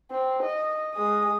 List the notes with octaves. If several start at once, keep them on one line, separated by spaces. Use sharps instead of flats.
C4
D#5
G#3 D#6